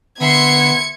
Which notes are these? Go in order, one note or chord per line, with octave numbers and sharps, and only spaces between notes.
D3 B3 E5 C6 G#6 C#7